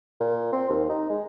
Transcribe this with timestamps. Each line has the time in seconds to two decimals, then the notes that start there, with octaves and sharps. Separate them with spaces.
0.21 A#2
0.52 C4
0.70 D#2
0.89 D#4
1.10 G#3